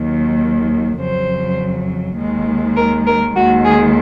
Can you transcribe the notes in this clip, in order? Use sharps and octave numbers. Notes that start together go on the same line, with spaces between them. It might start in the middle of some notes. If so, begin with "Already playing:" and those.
Already playing: D#2 D#3 F#3
F2 C#3 F#3 C5
D#2 D#3 G#3
A#4
A#4
D#2 D#3 G#3 F#4
G#4